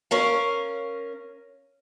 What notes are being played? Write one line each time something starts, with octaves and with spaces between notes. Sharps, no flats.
C#4 A#4 F5